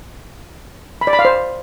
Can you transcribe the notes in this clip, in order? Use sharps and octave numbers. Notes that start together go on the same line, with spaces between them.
B5
D5
B5
F5
C5